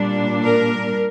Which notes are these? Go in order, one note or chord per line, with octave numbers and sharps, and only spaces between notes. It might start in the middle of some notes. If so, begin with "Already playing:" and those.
Already playing: A#2 G3 D4
A#4